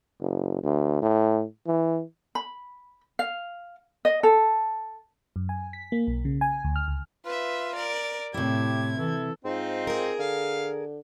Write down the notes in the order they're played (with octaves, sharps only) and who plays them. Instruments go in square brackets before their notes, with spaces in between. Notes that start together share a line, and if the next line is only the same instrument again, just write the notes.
[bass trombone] F#1
D2
A2
E3
[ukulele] B5
F5
D#5
A4
[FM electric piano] F#2
G#5
B6
A#3
B1
C#3
G#5
D2
F6
C#2
[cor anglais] F4 [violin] B4 E5
[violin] A#4 D5
[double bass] A2 [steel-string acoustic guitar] C3 E4 [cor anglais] G4 [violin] G#6
[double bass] E3 [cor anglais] A4
[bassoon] G#2 [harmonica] C4 D#4 F4
[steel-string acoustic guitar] G#4 A#4
[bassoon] D3 [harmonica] F5